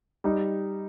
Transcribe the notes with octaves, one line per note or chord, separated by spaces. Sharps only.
G3 D#4